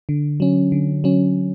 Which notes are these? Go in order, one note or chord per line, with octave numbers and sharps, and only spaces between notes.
D3
F#3 C#4
D3
F#3 C#4